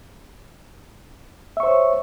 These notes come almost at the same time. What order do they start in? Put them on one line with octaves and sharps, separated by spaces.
E5 C#6 C5 C#5